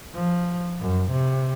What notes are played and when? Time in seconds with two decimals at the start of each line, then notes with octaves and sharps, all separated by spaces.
0.15 F3
0.80 F#2
1.11 C3